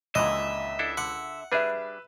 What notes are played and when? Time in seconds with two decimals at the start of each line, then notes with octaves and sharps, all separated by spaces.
0.15 C#2 A#2 D3 E3 D#5 E5
0.79 D4 E4 A4
0.97 D3 F#5
1.52 G3 D4 G#4 B4 E5